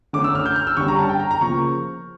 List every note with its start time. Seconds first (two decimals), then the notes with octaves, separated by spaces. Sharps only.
0.13 D3 A3 C#4 D6
0.24 E6
0.35 F6
0.46 G6
0.56 F6
0.67 E6
0.77 D3 G3 C#4 C#6
0.88 A#5
0.99 A5
1.09 G5
1.20 A#5
1.31 A#5
1.41 C#3 F3 A#3 C#6